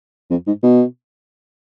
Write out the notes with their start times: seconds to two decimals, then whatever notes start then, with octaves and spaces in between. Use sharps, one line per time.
0.30 F2
0.47 G#2
0.63 B2